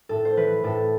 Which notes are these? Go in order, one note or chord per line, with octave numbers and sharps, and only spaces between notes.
A2 A4
C5
E3 B4
A2 A4